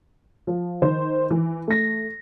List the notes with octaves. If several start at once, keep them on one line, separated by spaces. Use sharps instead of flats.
F3
D#3 C5
E3
A3 A#6